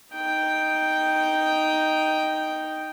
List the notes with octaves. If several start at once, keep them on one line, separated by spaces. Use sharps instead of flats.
D#4 G5